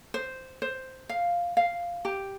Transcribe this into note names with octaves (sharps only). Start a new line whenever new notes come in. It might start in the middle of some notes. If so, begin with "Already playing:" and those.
C5
C5
F5
F5
G4